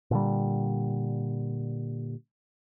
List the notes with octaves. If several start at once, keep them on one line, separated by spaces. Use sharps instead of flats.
A#2 D3 G3